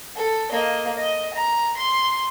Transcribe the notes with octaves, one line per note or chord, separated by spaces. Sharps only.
A4
A#3 D#5
D#5
A#5
C6